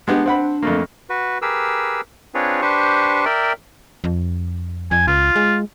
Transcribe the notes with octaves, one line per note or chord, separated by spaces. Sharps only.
G#3 B3 D4 G4
C4 F#5 B5
F2 A3 A#3
F#4 B4
G4 G#4 A#4 B4 E6
C4 D4 F4 G#4 B4 C#5
D4 G4 B4 C5 C#6
A#4 D5 E5 G5
F2
F2 G#5
C#2 F4
G#3